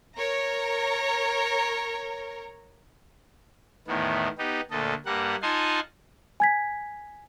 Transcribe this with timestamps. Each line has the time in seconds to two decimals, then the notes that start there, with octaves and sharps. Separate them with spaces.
0.15 A#4 C#5 A#5
3.87 E2 A2 D#3 B3
4.38 B3 D#4 G4
4.71 D2 A#2 A4 D#5
5.06 G2 G3 A#3 F#5
5.42 D#4 F4 F#5 G#5 A5 C6
6.40 G#5 G#6 B6